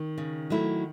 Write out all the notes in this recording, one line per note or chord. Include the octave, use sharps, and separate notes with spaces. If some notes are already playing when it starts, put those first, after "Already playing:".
Already playing: D#3
C#3
F#3 A3 E4